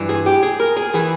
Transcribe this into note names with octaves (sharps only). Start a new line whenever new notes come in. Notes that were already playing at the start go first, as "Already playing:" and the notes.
Already playing: G2 E3
G#4
G4
G#4
A#4
G#4
E3 G#4